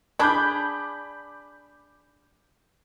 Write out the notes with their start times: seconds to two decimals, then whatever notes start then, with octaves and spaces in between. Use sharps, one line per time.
0.19 D4 G#4 B5 D6 G6